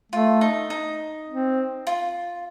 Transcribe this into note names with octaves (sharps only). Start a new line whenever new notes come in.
A3 F4
D#4
D#4
C4
F4